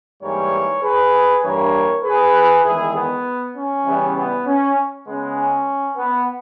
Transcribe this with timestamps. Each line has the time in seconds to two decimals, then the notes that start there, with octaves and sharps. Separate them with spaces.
0.22 G#2 E3 G3 A#3 A#4 C#5
0.83 G#4 B4
1.43 G2 E3 A#3 A#4 C#5
2.04 G#4 B4
2.64 E2 D#3 G#3 E4 G#4
2.95 B3
3.55 C#4
3.85 C#3 E3 G3 B3
4.16 B3
4.46 C#4
5.07 C#3 G#3 B3
5.37 C#4
5.97 B3